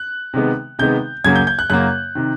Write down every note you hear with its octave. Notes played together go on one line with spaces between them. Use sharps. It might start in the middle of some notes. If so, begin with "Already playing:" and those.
Already playing: F#6
C3 D#3 G#3 B3
C3 D#3 G#3 B3 G6
F#2 C#3 F#3 A#3 G#6
G6
G6
F#6
F#2 C#3 F#3 A#3 F#6
C3 D#3